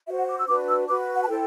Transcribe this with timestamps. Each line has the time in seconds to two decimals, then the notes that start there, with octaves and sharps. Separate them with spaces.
0.08 F#4 C5 E5
0.18 F#5
0.29 D6
0.38 E6
0.48 D4 F#4 B4 D6
0.69 E6
0.88 F#4 B4 D6
1.15 F#5
1.22 A5
1.28 E4 A4 C5 G5